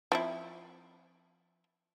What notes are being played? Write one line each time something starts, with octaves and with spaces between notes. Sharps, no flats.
F3 C4 E4